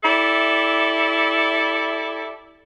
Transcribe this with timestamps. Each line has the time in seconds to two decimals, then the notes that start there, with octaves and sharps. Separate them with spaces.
0.03 E4 G4 A4 D5 E5